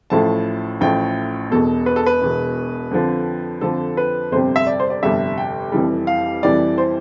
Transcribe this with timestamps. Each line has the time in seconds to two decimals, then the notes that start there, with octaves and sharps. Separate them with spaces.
0.10 A1 A2 F3 A3 A5
0.81 A1 A2 F3 A3 G5
1.51 E1 E2 B2 A4
1.86 B4
1.96 A4
2.06 B4
2.22 E1 E2 B2
2.91 F2 D3 F3
3.61 F2 D3 F3 A4
3.97 B4
4.32 G1 F2 C3 G3 C5
4.56 E5
4.67 D5
4.80 C5
4.90 D5
5.03 G1 F2 C3 G3 E5
5.38 G5
5.72 F1 F2 E3 G3
6.07 F5
6.43 F1 F2 E3 G3 D5
6.78 C5